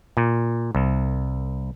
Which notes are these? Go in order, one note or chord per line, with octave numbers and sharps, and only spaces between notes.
A#2
C2